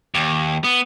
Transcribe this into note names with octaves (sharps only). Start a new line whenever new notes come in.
D#2
B3